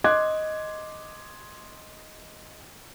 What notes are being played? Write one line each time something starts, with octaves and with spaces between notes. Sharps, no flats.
D#5 C6 D6 F#6 G#6